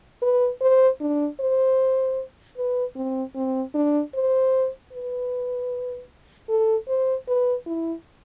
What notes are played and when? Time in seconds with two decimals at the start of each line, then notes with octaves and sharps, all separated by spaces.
0.22 B4
0.62 C5
1.01 D4
1.40 C5
2.58 B4
2.96 C4
3.35 C4
3.75 D4
4.15 C5
4.93 B4
6.49 A4
6.88 C5
7.28 B4
7.67 E4